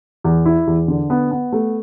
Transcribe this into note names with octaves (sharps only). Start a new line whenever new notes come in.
E2
E4
E2
D3
B3
B3
A3